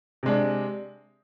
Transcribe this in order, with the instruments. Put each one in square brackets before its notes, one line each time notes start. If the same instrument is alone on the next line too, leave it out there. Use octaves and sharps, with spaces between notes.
[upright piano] C3 G#3 D4